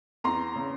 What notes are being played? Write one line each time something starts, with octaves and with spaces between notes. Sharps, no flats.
E2 A#5 C6
C#3